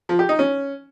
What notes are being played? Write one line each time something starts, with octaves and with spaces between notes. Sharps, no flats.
F3
G4
D#4
C#4